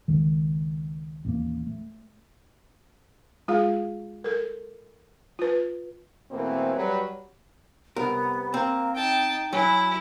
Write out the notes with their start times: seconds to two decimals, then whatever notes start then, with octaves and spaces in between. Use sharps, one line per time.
0.08 C#2 D#3
1.25 A1 D#2 A#3
1.67 A3
3.48 G#3 F4 G#4 F5
4.24 A4 A#4
5.39 F4 B4
6.31 B2 E3 A3 A#3 C4
6.74 F#3 G3 B4
7.96 C2 B3 A#4
8.54 A#3 C4
8.95 D#4 G5 A5
9.53 F#3 E4 G#5